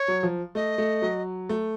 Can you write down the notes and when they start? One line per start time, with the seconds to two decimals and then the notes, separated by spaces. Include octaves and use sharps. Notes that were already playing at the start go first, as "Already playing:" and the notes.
Already playing: C#5
0.08 F#3
0.23 F3
0.55 A3 D#5
0.78 A3
1.02 F#3
1.49 A3